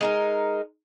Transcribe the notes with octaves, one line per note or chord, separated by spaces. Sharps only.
G#3 D#4 A#4